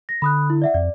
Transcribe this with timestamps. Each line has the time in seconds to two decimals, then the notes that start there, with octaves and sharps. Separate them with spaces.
0.09 A#6
0.22 D3 B5 D#6 F#6
0.50 E4
0.62 D5 E5 F#5
0.74 F2 D5